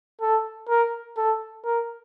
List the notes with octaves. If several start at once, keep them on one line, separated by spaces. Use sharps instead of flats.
A4
A#4
A4
A#4